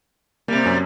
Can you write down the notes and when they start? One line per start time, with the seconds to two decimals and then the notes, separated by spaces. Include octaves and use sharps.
0.48 C3 G3 A#3
0.65 F#2